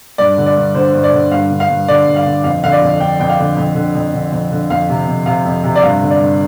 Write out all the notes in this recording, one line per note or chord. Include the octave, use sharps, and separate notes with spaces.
G2 D5
D3
D5
G2
D3 C5
G2
D5
D3
G2 F5
D3
F5
G2
D3 D5
G2
F5
D3
F2 F5
D3 F5
D5
F2
D3 G5
F2 G5
F5
D3
F2
D3
F2
D3
F2
D3
F2 F5
C3
F2
C3 F5
F2
C3
D5
G2 F5
D3
D5
G2